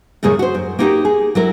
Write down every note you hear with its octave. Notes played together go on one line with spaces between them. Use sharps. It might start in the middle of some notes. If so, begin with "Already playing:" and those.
F#2 A2 C#3 A#3 G#4 C#5
F#4 C5
F#2
A#3 B3 D#4 F#4 G4 A#4
G#4
F#3 E4 A#4